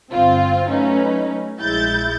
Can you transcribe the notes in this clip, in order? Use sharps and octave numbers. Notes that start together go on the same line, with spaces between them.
G1 C4 F4
F#3 A3 C#4 D#4 B4
A#1 G#3 E4 G6 A6